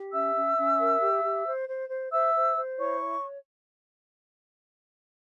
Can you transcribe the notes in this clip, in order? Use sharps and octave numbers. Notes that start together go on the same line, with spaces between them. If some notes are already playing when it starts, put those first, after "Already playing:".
Already playing: G4
C#4 E5 E6
C#4
C#4
A#4
G4
G4
C5
C5
C5
C5 E5 E6
C5
C5
E4 C#5 C#6
C#5